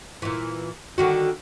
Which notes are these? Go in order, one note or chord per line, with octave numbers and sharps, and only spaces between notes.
A#2 E3
D3 D#3 F#4